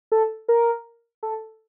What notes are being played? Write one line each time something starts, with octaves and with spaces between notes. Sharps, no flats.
A4
A#4
A4